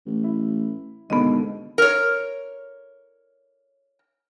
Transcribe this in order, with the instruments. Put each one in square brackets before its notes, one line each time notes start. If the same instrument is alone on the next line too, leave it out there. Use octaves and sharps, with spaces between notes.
[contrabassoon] A1
[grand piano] E4
[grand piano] D#2 B2 D3 [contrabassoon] G#2 [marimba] B3 D#5
[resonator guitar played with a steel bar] A#4 C#5